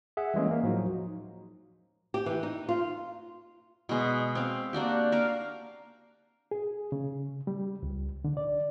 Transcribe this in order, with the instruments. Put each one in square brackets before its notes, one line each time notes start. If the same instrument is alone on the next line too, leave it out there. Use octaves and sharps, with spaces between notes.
[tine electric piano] G#4 E5 F#5
E3 G3 G#3 A#3 C#4
A#3
A2 F3 F#3 D#4 F#4
[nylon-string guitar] G4
E3
D#4
F4
[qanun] B2 G#3
C4 F5
A#3 D4 F#4 G4
A#3 A#4 F5
[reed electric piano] G#4
C#3
G3
C#2
D3
D5